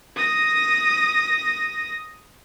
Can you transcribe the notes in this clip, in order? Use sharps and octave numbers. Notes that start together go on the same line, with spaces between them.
D#6 A#6